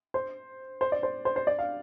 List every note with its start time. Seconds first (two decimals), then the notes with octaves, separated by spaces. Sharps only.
0.14 C5
0.81 C5
0.92 D5
1.03 C5
1.25 C5
1.36 C5
1.47 D5
1.59 F5